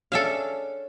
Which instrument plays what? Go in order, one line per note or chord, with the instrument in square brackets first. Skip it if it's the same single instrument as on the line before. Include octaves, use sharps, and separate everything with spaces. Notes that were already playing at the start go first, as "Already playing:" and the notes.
[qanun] C#4 D4 G#4 [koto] A4 E5 F5